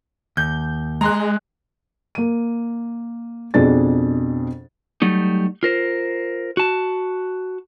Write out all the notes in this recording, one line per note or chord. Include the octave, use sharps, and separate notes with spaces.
D#2 G6
G#3 A#5 C6 F#6
A#3 D#7
F2 B2 D4 G#4 A6
F#3 G3 A3 D#4
F4 A#4 C5
F#4 A5